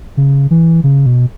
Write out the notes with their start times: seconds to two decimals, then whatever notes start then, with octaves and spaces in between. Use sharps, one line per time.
0.17 C#3
0.51 E3
0.84 C#3
1.06 B2